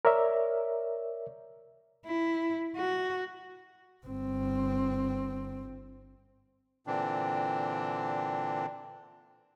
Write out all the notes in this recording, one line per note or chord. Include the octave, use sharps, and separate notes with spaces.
A#4 C#5 D5 E5
E4
F#4
G1 C4
A#2 D3 E3 C4 D4